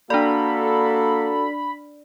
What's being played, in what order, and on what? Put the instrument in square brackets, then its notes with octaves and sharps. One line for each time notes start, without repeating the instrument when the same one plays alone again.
[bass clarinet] A#3 [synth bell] D4 D5 [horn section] F#4 A4 [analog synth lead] B5